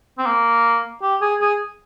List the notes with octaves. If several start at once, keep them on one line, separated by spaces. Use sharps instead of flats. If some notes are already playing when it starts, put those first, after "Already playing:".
C4
A#3
G4
G#4
G#4